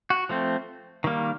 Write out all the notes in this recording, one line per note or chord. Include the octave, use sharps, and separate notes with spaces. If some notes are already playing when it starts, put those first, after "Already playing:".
F#4
F3 A3 C4
D#3 G3 A#3